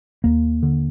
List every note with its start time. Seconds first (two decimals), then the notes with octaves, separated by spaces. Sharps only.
0.24 D#2 A#3
0.63 D3